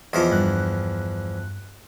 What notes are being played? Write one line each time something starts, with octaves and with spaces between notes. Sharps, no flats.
E2 F3 F4 D#5 D6
G2 F#6